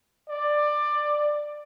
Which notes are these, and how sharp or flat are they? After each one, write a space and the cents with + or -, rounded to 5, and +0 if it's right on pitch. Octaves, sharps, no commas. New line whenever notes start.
D5 +15